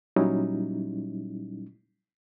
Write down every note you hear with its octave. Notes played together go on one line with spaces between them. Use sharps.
A#2 F#3 G3 C#4 D#4 E4